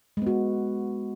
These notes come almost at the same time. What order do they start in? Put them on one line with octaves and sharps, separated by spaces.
G#3 B3 F#4